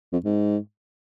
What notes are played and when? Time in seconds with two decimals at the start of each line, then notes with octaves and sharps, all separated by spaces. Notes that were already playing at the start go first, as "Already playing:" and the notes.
0.12 F2
0.25 G#2